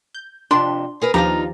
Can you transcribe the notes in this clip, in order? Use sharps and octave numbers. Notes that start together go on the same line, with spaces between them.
G6
F2 C3 D4 C6
G#4 A#4 B4
D#2 F3 D4 D#4 F4 G4 A#5